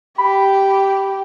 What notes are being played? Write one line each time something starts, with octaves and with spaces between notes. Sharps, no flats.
G4 B5